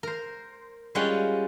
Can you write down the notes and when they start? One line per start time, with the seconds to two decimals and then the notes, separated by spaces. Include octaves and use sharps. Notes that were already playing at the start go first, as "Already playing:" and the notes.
0.03 A#4 C5
0.95 G3 G#3 C#4 F4 F#5 G5